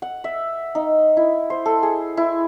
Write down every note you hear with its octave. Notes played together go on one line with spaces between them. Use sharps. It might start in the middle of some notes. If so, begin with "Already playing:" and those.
F#5
E5
D#4
E4
C5
A4
G#4
E4